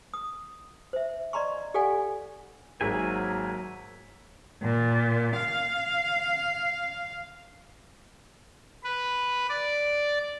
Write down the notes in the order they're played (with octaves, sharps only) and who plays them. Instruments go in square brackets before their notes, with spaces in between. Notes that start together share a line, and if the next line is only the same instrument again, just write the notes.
[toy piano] D#6
C5 E5
D5 D#5 A#5 C6 C#6
G4 A4 D5 F5 F#5 G#5
[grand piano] G#1 G#3 [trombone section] F#3 A#3 A#4 [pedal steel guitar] E5 G#5
[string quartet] A#2
F5
[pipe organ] B4
D5